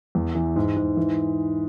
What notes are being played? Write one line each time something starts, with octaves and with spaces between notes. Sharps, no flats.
E2
E3
G#2
G#2
E3